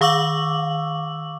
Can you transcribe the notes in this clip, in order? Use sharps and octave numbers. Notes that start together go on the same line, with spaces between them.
D#3 F5 C#6 D6 E6 F#7